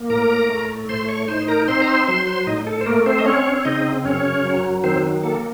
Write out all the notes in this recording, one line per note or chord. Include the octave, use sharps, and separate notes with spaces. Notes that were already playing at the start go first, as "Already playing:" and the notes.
Already playing: A#3
A2 A#4 A#5
A3
A2 C5 C6
C#5 C#6
D#4 C5 C6
A#4 A#5
C4 C5 C6
A#5
C5 C6
F#3 C5 C6
C5 C6
A2 D#4 D#5
A4
C5
A3 A#3 A#4
C4 C5
D#5
C4 C#4 C#5
C#5
C#3 D#4 D#5
F#2 C#4 C#5
F#3
D#3 C4 C5
A#3 A4